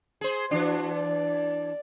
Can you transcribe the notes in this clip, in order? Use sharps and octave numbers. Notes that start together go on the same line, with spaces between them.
G#4 C5
E3 D4 F#4
D5